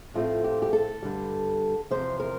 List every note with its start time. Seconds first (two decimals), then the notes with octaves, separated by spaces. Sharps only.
0.14 A2 F3 A3 C4 F4
0.44 G4
0.62 G4
0.73 A4
1.03 G2 D3 G3
1.91 E2 C3 F3 C5
2.20 A#4